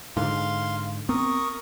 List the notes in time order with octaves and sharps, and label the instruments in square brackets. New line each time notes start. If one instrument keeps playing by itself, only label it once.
[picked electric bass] G#2 D3 [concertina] F5 C6
[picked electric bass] B3 C4 [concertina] A#4 C#6 D#6